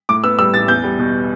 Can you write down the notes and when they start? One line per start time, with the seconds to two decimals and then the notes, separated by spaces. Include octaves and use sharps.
0.09 A2 D6
0.24 B3 E6
0.39 G3 E6
0.54 A1 A6
0.68 E2 G6
0.84 G3
0.99 B2